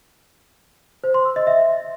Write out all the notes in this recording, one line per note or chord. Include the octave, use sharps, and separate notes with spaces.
C5
C6
E6
D#5
E5